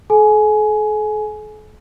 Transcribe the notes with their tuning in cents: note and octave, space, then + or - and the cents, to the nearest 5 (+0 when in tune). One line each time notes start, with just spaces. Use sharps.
A4 -45 G#5 +20